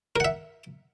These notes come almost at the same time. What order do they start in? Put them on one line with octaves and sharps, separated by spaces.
A#4 F#5 E5